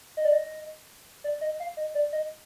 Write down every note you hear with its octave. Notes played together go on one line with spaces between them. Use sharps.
D#5
D5
D#5
D5
D#5
F5
D#5
D5
D#5